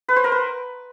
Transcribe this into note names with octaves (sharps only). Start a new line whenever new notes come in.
B4
C5
A#4
B4